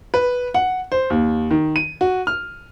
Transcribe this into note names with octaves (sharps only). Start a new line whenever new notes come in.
B4
F#5
C5
D#2
D#3
D#7
F#4
F6